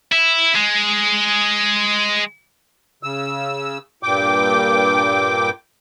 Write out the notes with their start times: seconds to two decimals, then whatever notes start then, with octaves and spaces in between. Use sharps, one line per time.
0.12 E4
0.55 G#3
3.03 C#3 E6
4.03 G2 A#2 G5 D6